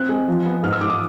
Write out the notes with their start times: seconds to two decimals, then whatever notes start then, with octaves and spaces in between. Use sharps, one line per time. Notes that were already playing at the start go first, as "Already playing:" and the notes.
Already playing: C4 F#6
0.09 G#3
0.28 F3
0.46 B3
0.63 G#2 F6
0.73 E6
0.81 G#2 D6
0.90 D#6